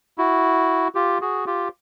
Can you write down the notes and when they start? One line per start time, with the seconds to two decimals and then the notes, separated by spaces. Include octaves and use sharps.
0.18 E4 F#4
0.95 F4 G4
1.21 F#4 G#4
1.47 F4 G4